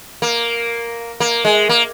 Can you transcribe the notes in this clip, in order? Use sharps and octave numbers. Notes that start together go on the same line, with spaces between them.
A#3
A#3
G#3
A#3